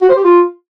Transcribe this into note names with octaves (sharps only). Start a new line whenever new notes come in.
F#4
C5
G4
F4